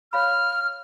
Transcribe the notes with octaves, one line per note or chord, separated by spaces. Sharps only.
C#5 F5 B5 F6